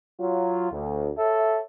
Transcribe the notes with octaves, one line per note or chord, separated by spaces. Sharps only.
F#3 F4
D2
A4 C#5 E5